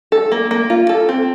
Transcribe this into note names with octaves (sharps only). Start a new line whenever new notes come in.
A4
A#3
A#3
F4
A4
C4